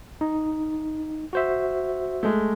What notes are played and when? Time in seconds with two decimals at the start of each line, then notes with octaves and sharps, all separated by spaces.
0.21 D#4
1.33 F#4 C5 E5
2.23 G#3 A3